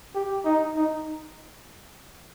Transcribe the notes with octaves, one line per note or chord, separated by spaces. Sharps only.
G4
D#4
D#4